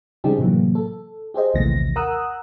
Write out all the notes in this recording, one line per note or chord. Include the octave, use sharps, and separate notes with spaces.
C#3 G3 C4 D#4 G4 G#4
A2 C3 E3 F#3 A#3
A4
G4 G#4 C5 D#5
A#1 D#2 C3 E3 A3 A#6
A#4 F#5 A#5 D#6 E6 F#6